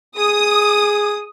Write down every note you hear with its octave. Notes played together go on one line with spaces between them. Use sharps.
G#4 D#6